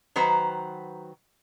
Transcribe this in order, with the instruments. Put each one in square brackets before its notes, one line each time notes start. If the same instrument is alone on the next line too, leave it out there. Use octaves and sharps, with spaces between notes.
[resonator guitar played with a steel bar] D#3 F#3 B4 C5 A#5